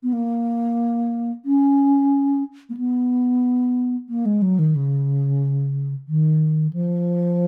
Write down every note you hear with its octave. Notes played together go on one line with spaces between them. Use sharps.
B3
A#3
C#4
A#3
B3
A#3
G#3
F#3
D#3
C#3
D#3
F3